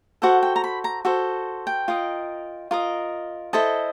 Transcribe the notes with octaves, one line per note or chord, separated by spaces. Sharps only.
F#4 A4 C5 F#5
G5
A#5
B5
A#5
F#4 A4 C5
G5
F4 A#4 D#5
F4 A#4 D#5
E4 A4 C5 D#5 A5